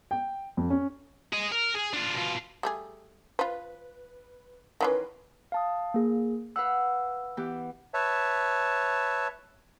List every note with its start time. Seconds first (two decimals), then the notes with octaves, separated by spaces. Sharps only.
0.11 G5
0.57 F2
0.70 C#4
1.33 G#4 D#5
1.52 A#4
1.74 G#4
1.93 D4 F4
2.15 B2 F4
2.63 G3 A3 G#4
3.39 F4 B4 C5
4.81 D#3 E3 C#4 A#4 B4 C6
5.52 F5 A5 D#6
5.94 A#3 G#4
6.56 B4 F5 F#5 E6
7.37 E3 B3 G4
7.94 B4 C#5 E5 A5